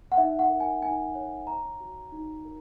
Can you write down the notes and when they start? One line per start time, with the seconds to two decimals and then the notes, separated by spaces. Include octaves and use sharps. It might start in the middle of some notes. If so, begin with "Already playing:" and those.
0.12 F#5
0.18 D#4 E5
0.39 F#5
0.50 A#4
0.60 G#5
0.82 D#4 G#5
1.15 C#5
1.47 C#5 A#5
1.80 F#4
2.12 D#4
2.45 A#4